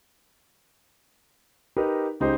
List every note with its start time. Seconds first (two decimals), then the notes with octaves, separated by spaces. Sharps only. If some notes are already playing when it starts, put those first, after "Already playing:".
1.77 D#4 G4 A#4 B4
2.20 C#2 C#3 D#4 G4 C5 C6